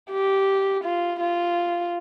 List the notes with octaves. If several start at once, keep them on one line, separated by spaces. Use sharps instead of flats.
G4
F4
F4